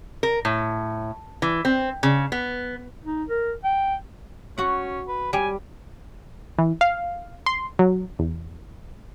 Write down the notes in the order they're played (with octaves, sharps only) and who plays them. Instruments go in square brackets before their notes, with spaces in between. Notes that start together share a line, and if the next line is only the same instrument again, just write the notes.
[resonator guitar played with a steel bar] A#4
A2
E3
C4
C#3
B3
[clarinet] D#4
A#4
G5
[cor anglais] C#4 [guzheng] F#4 F#5
[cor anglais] B4
[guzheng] G3 [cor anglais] G#5
[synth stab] E3
F5
C6
F#3
E2